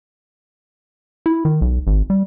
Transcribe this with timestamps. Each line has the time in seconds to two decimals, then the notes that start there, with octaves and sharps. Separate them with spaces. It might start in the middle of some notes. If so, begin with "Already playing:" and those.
1.26 E4
1.45 D#3
1.61 B1
1.87 G#1
2.10 G3